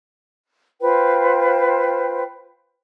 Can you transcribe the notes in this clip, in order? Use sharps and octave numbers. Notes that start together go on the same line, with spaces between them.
F4 B4 C5 G5